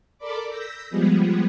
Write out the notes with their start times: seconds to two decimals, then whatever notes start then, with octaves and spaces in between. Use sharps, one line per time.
0.18 A4 A#4 D5 B5 D6
0.48 E6 G6 A#6 B6
0.90 F3 G3 G#3 B3 G#4